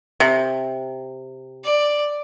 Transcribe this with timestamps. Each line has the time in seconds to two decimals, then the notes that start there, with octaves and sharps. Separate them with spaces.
0.20 C3
1.64 D5